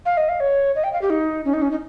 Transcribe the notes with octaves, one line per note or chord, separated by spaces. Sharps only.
F5
D#5
F5
C#5
D#5
G5
F5
G4
D#4
C#4
D#4
C#4
D#4